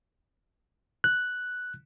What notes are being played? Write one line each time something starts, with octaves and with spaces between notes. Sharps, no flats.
F#6